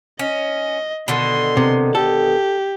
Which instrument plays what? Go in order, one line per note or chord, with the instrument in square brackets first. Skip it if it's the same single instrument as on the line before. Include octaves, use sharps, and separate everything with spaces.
[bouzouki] C#4 [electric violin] D#5
[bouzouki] B2 D3 D#3 [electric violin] C6
[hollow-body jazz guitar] C3
[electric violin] G4 [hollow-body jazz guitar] A4